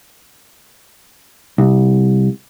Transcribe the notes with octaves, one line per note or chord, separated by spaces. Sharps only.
C2